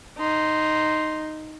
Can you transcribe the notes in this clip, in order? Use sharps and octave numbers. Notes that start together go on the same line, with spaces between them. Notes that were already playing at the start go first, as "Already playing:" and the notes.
D#4 C6